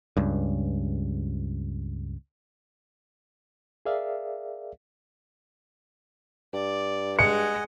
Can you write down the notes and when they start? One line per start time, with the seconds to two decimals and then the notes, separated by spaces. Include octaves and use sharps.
0.17 C#2 G2
3.85 G#4 A#4 D5 E5 F5
6.53 G2 D5
7.19 G#3 D#5 F#5 G#5 C#7